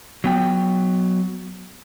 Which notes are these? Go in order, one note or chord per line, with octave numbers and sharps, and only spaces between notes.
F#3 B3 G5